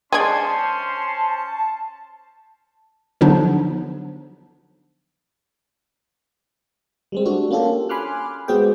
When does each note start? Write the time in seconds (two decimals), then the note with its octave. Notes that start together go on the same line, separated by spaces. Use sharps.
0.12 G#3 C#4 D4 C5 G#5 A5 C6 G#6
3.21 D3 F3 F#3 B3 D4 D#4
7.12 G3 G#3 C4
7.25 A3 D4 F#4 A4
7.51 A#3 C#4 F4 G4 A4
7.89 G#5 B5 C6 D6 F6 F#6
8.48 G#3 B3 C4 F#4 G#4 G5